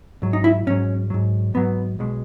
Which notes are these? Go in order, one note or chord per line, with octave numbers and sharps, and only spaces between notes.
G#2 F#3
D#4
E4
G#2 F#3 C#4
G#2 F#3
G#2 F#3 B3
B1 B2 G#3